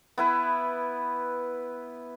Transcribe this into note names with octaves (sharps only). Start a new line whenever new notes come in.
B3 E4 B4